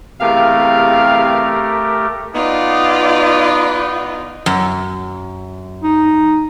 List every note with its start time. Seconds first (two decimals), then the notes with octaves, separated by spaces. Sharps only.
0.21 E2 C3 A3 G4 A#4 F5
2.34 B3 D#4 F4 D5
4.46 F#2
5.83 D#4